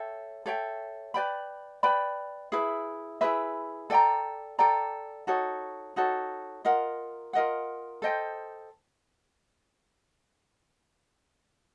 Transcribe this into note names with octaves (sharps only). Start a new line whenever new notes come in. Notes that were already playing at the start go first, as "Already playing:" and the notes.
Already playing: A4 C#5 E5 G5
A4 C#5 E5 G5
B4 D5 G5 B5
B4 D5 G5 B5
E4 G#4 B4 E5
E4 G#4 B4 E5
A4 D5 G5 A#5
A4 D5 G5 A#5
D#4 F#4 A4 C#5
D#4 F#4 A4 C#5
F4 A#4 D#5 F#5
F4 A#4 D#5 F#5
A4 C5 D#5 G5